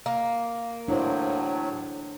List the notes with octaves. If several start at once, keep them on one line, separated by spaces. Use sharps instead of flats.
A#3
A2 F#3 D4 E4 C5